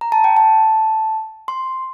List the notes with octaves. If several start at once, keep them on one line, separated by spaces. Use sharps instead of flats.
A#5
A5
G5
A5
C6